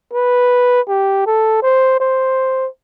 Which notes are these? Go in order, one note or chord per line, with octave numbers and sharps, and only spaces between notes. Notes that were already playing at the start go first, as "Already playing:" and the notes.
B4
G4
A4
C5
C5